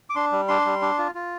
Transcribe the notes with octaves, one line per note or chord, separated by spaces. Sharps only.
D6
D4 C6
G3
D4 C6
G3
D4
F4
F4